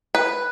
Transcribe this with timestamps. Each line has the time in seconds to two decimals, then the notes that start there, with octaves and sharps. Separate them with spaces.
0.15 B4